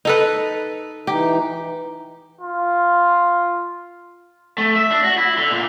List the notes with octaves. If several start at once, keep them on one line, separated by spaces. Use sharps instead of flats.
D#4 A4 B4
E3 D#4 G4
F4
A3
E5
D4
F#4
E4
D3
A#2